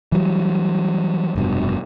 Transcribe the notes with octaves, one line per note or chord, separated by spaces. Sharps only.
E3 F#3 G3
F1 G2 B2